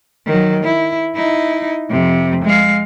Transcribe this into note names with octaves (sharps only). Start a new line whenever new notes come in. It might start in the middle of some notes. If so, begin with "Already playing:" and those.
D#3 F#3
E4
D#4 E4
F2 C3
G#3 F5